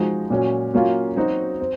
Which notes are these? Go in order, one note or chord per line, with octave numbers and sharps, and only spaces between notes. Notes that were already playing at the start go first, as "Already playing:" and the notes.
Already playing: F3 G#3 D#4 F#4
A#2 F#3 C#4
F#3 A#3 C#4 F4
F#3 C4 D#4 F#4
C4